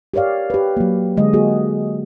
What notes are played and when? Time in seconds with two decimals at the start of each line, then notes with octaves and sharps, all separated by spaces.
0.14 G4 A#4 C#5 D5 F5
0.50 G4 B4
0.77 F#3 A#3
1.17 D3 G#3 D#5
1.33 A#3 F#4 G#4